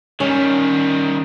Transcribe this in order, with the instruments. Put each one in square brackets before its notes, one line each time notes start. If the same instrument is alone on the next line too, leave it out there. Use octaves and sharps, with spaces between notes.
[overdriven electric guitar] D#3 G3 [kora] C#4